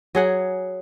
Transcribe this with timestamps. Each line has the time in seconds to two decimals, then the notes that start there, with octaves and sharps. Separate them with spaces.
0.15 F#3 G#4 F#5